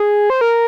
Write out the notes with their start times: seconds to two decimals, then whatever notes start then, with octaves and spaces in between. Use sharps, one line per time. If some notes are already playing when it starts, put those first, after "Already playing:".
Already playing: G#4
0.30 C5
0.41 A#4